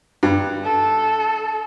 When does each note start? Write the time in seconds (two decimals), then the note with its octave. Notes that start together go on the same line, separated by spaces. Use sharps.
0.23 G2
0.64 A4